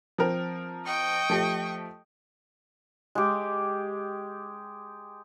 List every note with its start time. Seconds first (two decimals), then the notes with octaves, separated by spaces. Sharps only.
0.18 F3 C4 A#4
0.85 D#5 G5 C#6
1.30 F3 A3 G4
3.15 G#3 G4